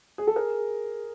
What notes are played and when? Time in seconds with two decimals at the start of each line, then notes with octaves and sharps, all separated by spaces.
0.18 G#4
0.27 A4
0.36 G#4 A#4